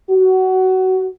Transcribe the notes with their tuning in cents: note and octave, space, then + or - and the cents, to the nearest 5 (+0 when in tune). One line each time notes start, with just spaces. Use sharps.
F#4 +20